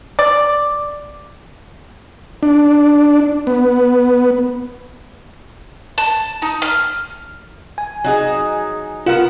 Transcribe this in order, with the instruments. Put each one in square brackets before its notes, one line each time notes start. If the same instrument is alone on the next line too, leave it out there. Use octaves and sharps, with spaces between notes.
[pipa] D5
[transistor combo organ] D4
B3
[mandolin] A5
D#4
F6
[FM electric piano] G#5
[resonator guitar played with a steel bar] F#3 D#4 G#4
[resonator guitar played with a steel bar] B3 A#4 F#5 [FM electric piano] F4